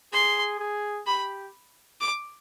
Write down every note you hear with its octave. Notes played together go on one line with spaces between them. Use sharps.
G#4 C6
G#4
G4 B5
D6